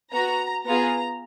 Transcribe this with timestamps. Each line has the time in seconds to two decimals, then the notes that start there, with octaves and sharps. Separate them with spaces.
0.12 B3 F#4 A#5
0.65 B3 F4 G#4 A#5